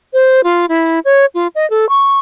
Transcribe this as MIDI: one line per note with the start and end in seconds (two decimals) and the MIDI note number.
0.13 0.44 72
0.44 0.66 65
0.69 1.00 64
1.05 1.26 73
1.35 1.47 65
1.55 1.68 75
1.70 1.88 69
1.89 2.19 85